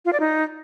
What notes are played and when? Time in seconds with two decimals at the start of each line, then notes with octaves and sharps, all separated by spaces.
0.05 F4
0.13 D5
0.20 D#4